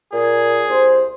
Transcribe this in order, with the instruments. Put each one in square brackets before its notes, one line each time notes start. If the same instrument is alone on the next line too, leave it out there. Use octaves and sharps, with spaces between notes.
[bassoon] A#2 [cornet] G#4
[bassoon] C2 [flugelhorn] C5